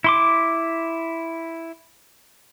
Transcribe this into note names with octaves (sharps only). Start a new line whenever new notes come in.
E4 C6 D6